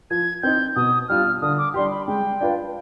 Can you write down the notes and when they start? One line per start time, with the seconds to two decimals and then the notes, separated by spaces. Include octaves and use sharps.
0.11 F3 G#6
0.43 C4 D#4 G6
0.76 B2 D#6
1.09 G3 D4 F4 F6
1.41 D3 D#6
1.58 D6
1.74 G3 D4 G4 C6
1.91 B5
2.07 G#3 G5
2.40 D4 F4 B4